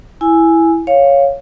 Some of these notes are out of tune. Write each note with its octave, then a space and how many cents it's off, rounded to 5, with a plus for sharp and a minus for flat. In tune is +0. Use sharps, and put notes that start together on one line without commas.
E4 +0 G#5 +0 E6 +0
C#5 +0 F5 +0